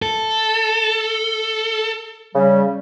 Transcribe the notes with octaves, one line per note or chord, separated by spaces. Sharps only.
A4
C#3 G3